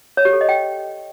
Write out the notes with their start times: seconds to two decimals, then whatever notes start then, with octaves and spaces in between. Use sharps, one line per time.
0.17 C#5
0.25 G4
0.33 A4
0.41 D#5
0.49 G5